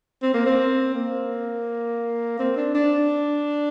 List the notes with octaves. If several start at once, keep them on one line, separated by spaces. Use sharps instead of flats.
C4
A#3
C4
A#3
C4
D4
D4